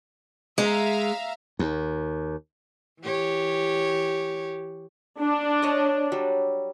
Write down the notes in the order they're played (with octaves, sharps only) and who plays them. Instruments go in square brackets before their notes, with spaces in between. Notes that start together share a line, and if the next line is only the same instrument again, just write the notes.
[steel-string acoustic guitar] G#3 [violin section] E5 F5 A#5
[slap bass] D#2
[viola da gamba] E3 G4 C#5
[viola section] D4
[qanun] C#5 D#5
F#3 G3